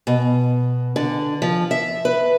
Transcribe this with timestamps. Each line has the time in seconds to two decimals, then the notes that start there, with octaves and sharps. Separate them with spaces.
0.07 B2
0.96 D3
1.42 F3
1.71 E5
2.05 B4